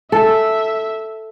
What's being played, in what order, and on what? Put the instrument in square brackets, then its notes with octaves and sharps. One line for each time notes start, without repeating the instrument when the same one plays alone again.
[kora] A4 [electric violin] E5